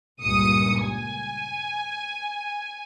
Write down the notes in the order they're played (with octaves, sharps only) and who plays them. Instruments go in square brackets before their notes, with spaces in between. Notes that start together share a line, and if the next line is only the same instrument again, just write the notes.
[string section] C#2 G2 A#2 D#6 C#7
G#5